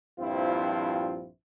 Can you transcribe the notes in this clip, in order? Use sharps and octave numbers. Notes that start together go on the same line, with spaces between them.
A#1 G2 F3 C4 E4 F4